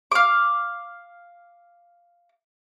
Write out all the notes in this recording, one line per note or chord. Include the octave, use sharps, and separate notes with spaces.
F5 D6